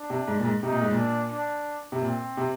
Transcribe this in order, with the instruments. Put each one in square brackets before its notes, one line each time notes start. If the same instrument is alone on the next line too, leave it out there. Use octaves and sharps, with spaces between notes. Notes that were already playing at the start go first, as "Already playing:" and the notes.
Already playing: [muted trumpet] D4
[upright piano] C3
G#2
A#2
G#2
[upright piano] C3 [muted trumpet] D#4
[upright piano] A#2
G#2
A#2
[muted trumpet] D4
D4
[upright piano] C3
[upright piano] A#2 [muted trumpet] C4
[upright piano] C3